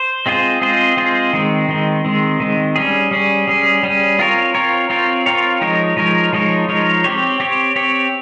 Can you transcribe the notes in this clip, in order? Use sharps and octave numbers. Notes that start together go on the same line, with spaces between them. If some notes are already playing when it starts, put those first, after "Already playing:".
Already playing: C5
G#3 C4 F4 G#4 C5
G#3 C4 F4 G#4 C5
G#3 C4 F4 G#4 C5
D#3 G#3 C4
D#3 G#3 C4
D#3 G#3 C4
D#3 G#3 C4
G3 C#4 G#4
G3 C#4 G#4
G3 C#4 G#4
G3 C#4 G#4
C4 F4 A#4 C#5
C4 F4 A#4 C#5
C4 F4 A#4 C#5
C4 F4 A#4 C#5
F3 G#3 D#4 A#4 C#5
F3 G#3 D#4 A#4 C#5
F3 G#3 D#4 A#4 C#5
F3 G#3 D#4 A#4 C#5
C4 G4 C#5
C4 G4 C#5
C4 G4 C#5